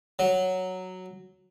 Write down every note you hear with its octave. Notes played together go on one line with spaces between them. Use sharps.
F#3